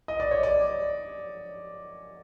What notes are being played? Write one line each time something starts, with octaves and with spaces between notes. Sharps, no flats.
D#5
D5
C#5
D5